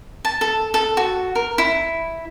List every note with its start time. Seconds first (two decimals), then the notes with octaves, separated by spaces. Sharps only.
0.25 A5
0.41 A4
0.74 A4
0.97 F#4
1.35 A#4
1.58 E4